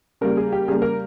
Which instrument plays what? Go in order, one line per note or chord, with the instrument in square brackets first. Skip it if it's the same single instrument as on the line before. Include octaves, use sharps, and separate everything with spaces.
[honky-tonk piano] C#3 G3 A#3 A#4
G#4
G4
C#3 G3 A#3 G#4
A#4